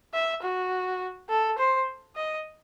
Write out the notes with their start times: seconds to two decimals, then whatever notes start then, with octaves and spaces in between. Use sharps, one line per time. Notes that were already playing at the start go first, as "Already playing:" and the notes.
0.14 E5
0.43 F#4
1.29 A4
1.58 C5
2.16 D#5